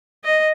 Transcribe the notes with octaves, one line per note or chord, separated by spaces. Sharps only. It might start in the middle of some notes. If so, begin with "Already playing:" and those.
D#5